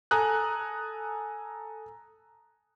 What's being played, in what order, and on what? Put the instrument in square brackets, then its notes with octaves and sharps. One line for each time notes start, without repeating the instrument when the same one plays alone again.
[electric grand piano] A4 G#5 A#5 D#6 F#6